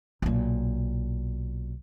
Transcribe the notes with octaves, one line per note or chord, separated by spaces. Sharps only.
B1 A#2